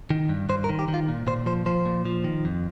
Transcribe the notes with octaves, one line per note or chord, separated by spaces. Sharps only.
D#3
G2
G2 C5
A#4
D#3
G4
D#3
F4
A#2
A#2 C5
F3 C5
F3 C5
A#2
F3
D#3
F2